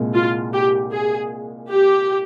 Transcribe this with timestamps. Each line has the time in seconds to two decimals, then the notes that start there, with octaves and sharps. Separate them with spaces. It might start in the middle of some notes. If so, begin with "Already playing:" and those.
Already playing: C2 A#2 G#3
0.15 F4
0.53 G4
0.92 G#4
1.69 G4